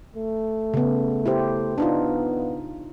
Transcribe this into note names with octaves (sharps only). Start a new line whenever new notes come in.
A3
C#3 B3
E4 G4 C5
B3 D4 D#4 F4